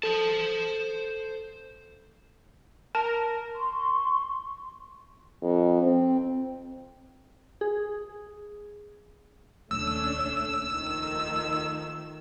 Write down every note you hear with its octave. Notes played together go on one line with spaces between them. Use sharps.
A4 C5 A5
A#4 A5
C6 C#6
F2
C4
G#4
D#1 C#2 A3 C#4 D4 E6
D#3 F3 A3